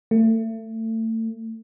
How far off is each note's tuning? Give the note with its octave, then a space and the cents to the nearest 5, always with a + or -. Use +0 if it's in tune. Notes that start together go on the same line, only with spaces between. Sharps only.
A3 +30